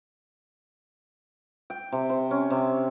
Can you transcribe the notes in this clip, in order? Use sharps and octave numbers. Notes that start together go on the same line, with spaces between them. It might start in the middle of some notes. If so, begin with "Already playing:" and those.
G5
C3
C5
C#4
C3